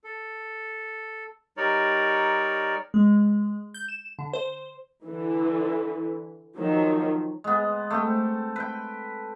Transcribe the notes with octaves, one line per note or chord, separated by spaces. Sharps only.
A4
G3 D#4 A#4 C#5 D5
G#3
G6
E7
D3
C5
D3 E3
D#3 F3 F#3
G#3 B3
A3 C4 G5
B4 G5